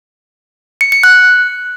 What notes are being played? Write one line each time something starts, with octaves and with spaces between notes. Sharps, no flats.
C#7
C#7
F#6